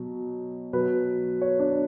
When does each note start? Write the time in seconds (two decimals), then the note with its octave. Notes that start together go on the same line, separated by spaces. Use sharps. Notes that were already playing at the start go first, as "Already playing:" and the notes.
Already playing: B2 F#3
0.73 B2 F#3 B4
1.42 C#5
1.60 D4